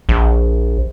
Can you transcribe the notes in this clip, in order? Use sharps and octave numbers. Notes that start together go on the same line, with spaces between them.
A#1